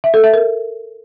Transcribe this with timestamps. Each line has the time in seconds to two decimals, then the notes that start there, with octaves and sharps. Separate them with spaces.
0.04 E5
0.14 A4
0.24 E5
0.34 A#4